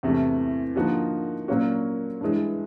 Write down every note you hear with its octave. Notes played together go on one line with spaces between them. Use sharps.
E2 C3 E3 A3
D3 F3 A#3 D#4 F#4
A#2 F#3 A#3 C#4 F#4
G2 E3 G#3